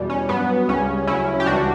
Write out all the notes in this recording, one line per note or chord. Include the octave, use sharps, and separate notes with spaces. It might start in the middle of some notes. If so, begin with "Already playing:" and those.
Already playing: E2 B2 G3
C#4
G2 F#3 B3
C#2 C#3 G3 C#4
D2 C#3 F#3 C#4 E4
G4
C#2 C#3 E3 G3 D4 F#4